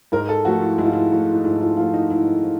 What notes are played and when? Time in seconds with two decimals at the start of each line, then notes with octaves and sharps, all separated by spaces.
0.12 G#2 A#4
0.29 A4
0.45 F3 A3 F#4
0.61 E4
0.78 G#2 E4
0.86 F4
0.93 E4
1.12 F3 A3
1.34 D#4
1.45 G#2 E4
1.61 F4
1.77 F3 A3 F4
1.94 D#4
2.10 G#2 E4
2.43 F3